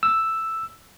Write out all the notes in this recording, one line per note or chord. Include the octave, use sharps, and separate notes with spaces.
E6